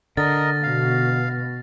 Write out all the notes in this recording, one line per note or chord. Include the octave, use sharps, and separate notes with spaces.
D3 A#4 D#5 A6 A#6
B2 F5